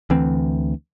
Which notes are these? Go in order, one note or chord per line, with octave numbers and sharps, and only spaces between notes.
D2 E3 C4